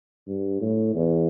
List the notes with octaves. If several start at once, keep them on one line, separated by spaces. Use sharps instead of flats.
G2
A2
E2